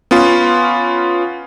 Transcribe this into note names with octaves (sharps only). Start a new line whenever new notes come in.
B3 C#4 F4